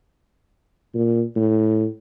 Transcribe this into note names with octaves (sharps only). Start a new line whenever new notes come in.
A#2
A2